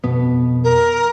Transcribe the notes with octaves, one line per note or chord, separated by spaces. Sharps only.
F2 B2 B3
A#4